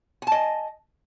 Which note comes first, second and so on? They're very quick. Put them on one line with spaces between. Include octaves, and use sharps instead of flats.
G#5 A5 D#5